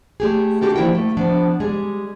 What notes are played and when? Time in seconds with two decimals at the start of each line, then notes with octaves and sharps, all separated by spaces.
0.20 A3 G4 G#4
0.61 D4 D#4 F#4 G4 A4 A#4
0.76 F3 G3 A#3 E4 F#5 G5
0.95 A3
1.17 F3 B3 D4
1.60 G3 G#3 G#4